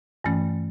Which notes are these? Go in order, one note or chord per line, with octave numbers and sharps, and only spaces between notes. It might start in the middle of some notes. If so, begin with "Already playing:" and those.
G2 E3 A3 C#4